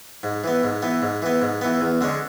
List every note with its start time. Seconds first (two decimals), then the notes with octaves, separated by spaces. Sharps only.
0.23 G#2
0.44 E3 B3
0.63 G#2
0.82 E3 B3
1.02 G#2
1.22 E3 B3
1.42 G#2
1.61 E3 B3
1.81 E2
2.01 D3 G#3 C#4